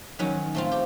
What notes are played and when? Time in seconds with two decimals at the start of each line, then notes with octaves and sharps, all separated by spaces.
0.19 D#3 F#3 C#4
0.55 A3 C4 F4
0.71 G4